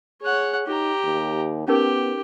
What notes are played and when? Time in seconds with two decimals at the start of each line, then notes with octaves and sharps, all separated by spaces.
0.22 G#4 C#5 F#5
0.67 D#4 G4 A#5
1.04 D#2
1.68 B3 C#4 D#4 G4 A#4